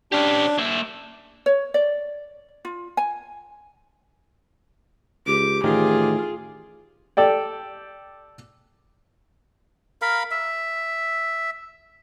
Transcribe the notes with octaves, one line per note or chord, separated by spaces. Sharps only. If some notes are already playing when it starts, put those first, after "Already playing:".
C#4 D4 G4
A#3 E5
C#5
D5
F4
G#5
C#2 G4 D6
A1 A2 D#3 F4 G#4
G4 A4 D5 G5
A#4 F5 B5
E5